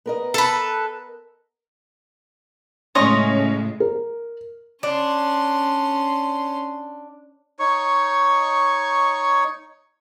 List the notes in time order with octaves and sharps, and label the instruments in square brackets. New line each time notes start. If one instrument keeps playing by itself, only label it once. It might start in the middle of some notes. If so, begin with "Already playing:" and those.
[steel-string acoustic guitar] B3 A#4 D#5
[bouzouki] A4 B4
[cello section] A2 C#3 G#3 [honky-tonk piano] C#4 [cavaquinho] D#5 C#6 [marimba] C6
[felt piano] A#4
[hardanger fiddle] C#4 C6 [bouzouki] D4
[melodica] D#4 C#5 C#6